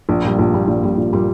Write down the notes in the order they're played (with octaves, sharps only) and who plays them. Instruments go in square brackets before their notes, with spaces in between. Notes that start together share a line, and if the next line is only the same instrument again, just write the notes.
[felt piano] A#1
A#2 G3
A#1
A#2 G3
A#1
A#2 G3
A#1
A#2 G3